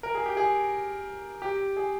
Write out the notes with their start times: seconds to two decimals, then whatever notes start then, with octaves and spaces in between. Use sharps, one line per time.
0.03 A#4
0.15 G#4
0.26 G4
0.37 G#4
1.42 G4
1.77 G#4